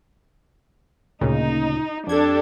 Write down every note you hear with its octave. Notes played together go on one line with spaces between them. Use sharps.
D2 A#2 C#3 D#4
F2 D4 G4 A4 G#6